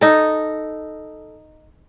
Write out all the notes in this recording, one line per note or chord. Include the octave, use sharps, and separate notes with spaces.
D#4 A4